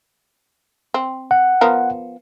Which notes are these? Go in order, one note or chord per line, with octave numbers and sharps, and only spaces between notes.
C4
F#5
F3 B3 A#4